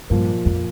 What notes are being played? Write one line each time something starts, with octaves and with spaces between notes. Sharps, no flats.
G2 A#2 F3 A#3
F2